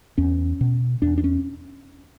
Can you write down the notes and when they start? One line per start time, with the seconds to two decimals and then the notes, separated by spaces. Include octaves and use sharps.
0.18 E2 C#4
0.61 B2
1.02 E2 D4
1.18 D4
1.24 C#4